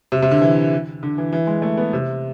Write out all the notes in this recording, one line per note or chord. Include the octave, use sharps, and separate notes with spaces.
C3
C3
D3
E3
D3
E3
E3
G#3
A3
B3
C3